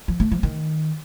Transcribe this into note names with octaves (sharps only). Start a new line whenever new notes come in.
F3
A3
F3
D#3